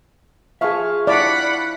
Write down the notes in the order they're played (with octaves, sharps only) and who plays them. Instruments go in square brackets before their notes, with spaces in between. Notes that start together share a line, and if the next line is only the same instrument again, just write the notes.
[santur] F3 F5 C#6 [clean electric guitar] G#4 E5
[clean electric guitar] E4 [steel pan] D5 [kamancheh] F#5 B5